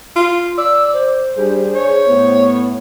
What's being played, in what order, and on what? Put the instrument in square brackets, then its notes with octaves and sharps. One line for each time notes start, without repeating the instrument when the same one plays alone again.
[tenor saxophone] F4
[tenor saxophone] D5 [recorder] E6
[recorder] C5
[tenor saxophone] G3 [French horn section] D4 G#4
[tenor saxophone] C#5
[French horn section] A2 B3